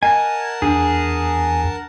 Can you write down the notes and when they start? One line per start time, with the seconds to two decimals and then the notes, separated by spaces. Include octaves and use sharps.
0.03 A#4 D#5 F#5 G#5 A5
0.62 E2 D4 G#4